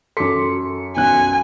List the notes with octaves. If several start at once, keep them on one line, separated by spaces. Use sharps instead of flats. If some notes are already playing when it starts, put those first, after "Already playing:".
F#2 A4 C6 D6 B6 C#7
B1 F#2 G#5 F#6